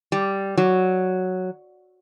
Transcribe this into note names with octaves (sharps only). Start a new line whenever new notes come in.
G3
F#3